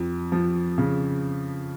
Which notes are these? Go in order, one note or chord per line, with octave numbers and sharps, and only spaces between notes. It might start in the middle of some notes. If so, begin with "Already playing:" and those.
Already playing: F2
F3
C#3